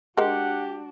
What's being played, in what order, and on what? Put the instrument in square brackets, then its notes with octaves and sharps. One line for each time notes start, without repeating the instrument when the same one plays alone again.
[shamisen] G#3 A#4 [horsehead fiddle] D4 F#4 [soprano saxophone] G4 [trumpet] F#5